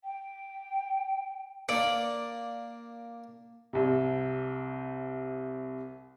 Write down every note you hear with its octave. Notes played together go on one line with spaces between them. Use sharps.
G5
A#3 D4 D5
C2 C3